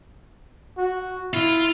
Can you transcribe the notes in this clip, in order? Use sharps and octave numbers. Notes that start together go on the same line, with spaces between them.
F#4
E4 F4